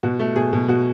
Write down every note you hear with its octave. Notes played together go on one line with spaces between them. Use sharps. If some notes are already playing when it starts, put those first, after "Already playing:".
B2 F#4
A3
B2 G#4
B2
B2 F#4